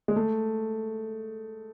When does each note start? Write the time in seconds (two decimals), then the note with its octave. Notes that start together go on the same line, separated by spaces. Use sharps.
0.08 G#3
0.16 A3